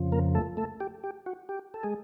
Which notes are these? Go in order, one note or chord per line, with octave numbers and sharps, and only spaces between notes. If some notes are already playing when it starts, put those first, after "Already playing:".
Already playing: F2 C#3 F3
A#3 A#4
A3 A4
A3 A4
G4
G4
F#4
G4
A4
G#3 G#4